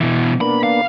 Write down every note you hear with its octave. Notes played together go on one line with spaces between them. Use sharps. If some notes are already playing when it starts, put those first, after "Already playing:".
B2 E3
A#3 B3 D4 B5
F5